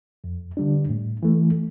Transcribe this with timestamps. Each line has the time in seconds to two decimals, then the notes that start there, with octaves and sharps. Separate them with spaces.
0.24 F2
0.57 D3 G3 D4
0.89 A2
1.23 E3 A3